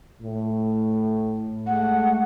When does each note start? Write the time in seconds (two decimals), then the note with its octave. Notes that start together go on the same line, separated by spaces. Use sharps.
0.21 A2
1.66 G#3 A3 F#5